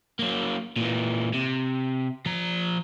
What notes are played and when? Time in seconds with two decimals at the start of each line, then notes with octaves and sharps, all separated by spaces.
0.19 F#3 A#3
0.76 A#2 E3
1.33 C3
2.26 F3 A#5